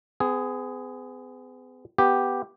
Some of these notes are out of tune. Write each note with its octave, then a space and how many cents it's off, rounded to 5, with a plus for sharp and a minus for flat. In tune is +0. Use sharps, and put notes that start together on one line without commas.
B3 +45 G#4 +0
B3 +0 G4 +0